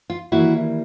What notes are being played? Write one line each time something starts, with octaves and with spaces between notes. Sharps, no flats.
F4
D#2 C#3 E3 G3 A#3 E4 F#4